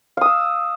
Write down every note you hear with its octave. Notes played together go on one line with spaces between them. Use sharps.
F5 D#6 E6